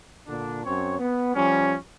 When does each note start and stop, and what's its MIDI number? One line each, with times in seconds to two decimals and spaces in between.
0.28 0.64 46
0.28 0.64 50
0.28 0.64 62
0.64 0.95 42
0.64 0.95 60
0.64 0.95 73
0.98 1.34 59
1.35 1.74 53
1.35 1.74 55
1.35 1.74 61